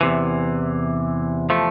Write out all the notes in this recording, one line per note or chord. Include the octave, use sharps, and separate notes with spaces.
E2 C3 E3
F3 A3